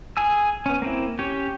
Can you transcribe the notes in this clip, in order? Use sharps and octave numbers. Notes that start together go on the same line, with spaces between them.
G#4 G#5 E6
B3 C#4
A#3 C4 E4
C#4 G4 C#5